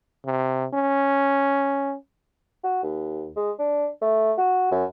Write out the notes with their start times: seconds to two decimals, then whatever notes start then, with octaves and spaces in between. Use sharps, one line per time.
0.25 C3
0.73 C#4
2.64 F#4
2.83 D#2
3.36 G#3
3.59 D4
4.01 A3
4.38 F#4
4.71 F#2